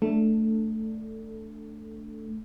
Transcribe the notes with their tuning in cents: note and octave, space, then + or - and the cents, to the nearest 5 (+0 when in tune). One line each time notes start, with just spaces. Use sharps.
A3 +0 D4 +0 A4 +15